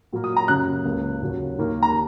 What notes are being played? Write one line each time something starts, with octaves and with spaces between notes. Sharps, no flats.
A#2 F#3 A#3
D#6
A#5
F#2 C#3 F#3 A#3 F#6
C#2 C#3 A#3
D#2 C#3 F#3
D#2 D#3 A#3
A#5